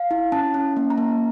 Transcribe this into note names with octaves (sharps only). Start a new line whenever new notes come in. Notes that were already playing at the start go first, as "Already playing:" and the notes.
Already playing: F5
E4
C#4 A5
C#4
A#3
A#5
A#3